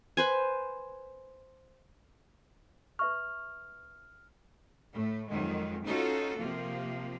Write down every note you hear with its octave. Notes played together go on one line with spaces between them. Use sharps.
B4 C5 G#5
B4 E5 C#6 F6
A2 A3
F2 D#3 F#3 G#3
C#4 D#4 F4 F#4 A4
C3 F3 A#3